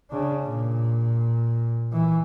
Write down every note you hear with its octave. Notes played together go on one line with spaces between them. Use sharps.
C#3 D4
A#2
E3